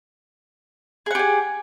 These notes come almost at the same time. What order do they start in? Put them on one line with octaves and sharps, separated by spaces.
G#4 F#5 G4 G#5